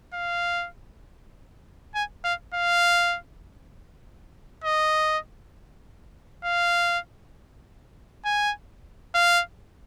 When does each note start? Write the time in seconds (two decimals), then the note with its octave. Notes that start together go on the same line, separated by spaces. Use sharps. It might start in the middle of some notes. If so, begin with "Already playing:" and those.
0.14 F5
1.95 G#5
2.25 F5
2.55 F5
4.64 D#5
6.45 F5
8.25 G#5
9.15 F5